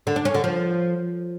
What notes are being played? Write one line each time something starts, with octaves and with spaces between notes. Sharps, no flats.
D3
D4
C#4
D3
F3